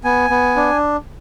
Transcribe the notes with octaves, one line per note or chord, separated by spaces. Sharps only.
B3 G#5
B3
D4